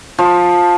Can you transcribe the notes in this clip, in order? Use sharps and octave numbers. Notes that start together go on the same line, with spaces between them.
F3